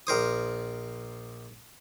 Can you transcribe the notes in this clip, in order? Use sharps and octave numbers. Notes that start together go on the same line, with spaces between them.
A#1 A#4 C5 D#6